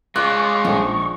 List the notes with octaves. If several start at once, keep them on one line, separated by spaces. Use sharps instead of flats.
G#3 F4 D5 C#6 F#6
A#1 F3 D#4